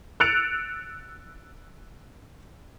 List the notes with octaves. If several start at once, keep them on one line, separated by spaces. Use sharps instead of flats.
E6 F#6 A6 C#7 D7 F7